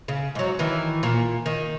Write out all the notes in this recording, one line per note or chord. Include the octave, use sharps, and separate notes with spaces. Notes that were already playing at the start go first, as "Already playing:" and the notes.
C#3
G#2 F#3
D#3 E3
A#2
D#3